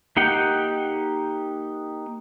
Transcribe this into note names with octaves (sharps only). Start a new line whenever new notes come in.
A#3 D#4 G4 F#5 G5